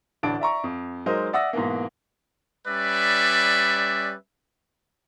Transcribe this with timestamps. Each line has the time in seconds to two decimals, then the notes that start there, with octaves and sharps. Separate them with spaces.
0.23 A1 D2 D4 D7
0.40 D5 E5 A#5 C#6
0.64 F2
1.06 F#3 G#3 D#4 A#4 C5 D#5
1.33 D5 E5 F#5 D#6 E6 A#6
1.53 G#2 B2 E3 A#3
2.68 G3 C#4 B4 D5 E5